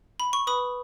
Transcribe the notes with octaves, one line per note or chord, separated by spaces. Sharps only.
B5
C#6
B4 B5 D#6